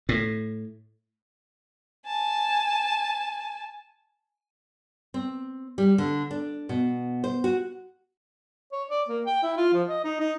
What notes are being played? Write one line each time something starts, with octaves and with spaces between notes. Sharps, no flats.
A2
G#5 A5
C4
G3
D3
D4
B2
C5
F#4
C#5
D5
A#3
G5
E4
F4
F3
D#5
D#4
D#4